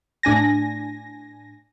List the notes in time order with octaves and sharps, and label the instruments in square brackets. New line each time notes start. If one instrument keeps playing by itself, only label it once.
[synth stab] A2 D4 G#5 A#6